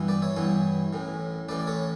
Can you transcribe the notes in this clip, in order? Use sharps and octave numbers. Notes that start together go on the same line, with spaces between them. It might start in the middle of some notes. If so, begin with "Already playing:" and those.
Already playing: G2 E3 B3 E4
B4 D5
C#5 E5
G2 E3 B3 E4
A1 A2 E3
A1 A2 E3 B4 D5
D5
A4 C#5